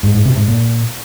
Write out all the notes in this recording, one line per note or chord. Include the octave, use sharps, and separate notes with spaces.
G#2
G#2
C3
G#2
A#2